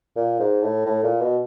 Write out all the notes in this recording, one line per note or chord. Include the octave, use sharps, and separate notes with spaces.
A#2
G#2
A2
A2
A#2
B2